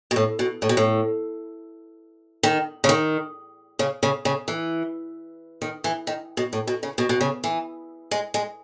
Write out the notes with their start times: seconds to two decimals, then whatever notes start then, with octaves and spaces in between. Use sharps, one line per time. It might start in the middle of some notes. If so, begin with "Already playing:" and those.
0.11 B2
0.16 A2
0.39 B2
0.62 A2
0.69 B2
0.77 A2
2.43 D#3
2.84 C#3
2.89 D#3
3.79 C#3
4.03 C#3
4.25 C#3
4.48 E3
5.62 D#3
5.84 E3
6.07 D#3
6.37 B2
6.53 A2
6.67 B2
6.83 C#3
6.98 B2
7.09 B2
7.21 C#3
7.44 E3
8.11 G#3
8.34 G#3